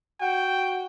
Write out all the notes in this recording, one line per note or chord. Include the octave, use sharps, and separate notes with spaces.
F#4 G5